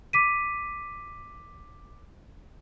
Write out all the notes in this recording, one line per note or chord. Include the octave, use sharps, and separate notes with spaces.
D6 B6 D#7